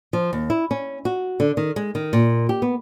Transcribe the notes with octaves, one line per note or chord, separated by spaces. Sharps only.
F3
D#2
E4
C#4
F#4
D3
D#3
G#3
D#3
A#2
G4
B3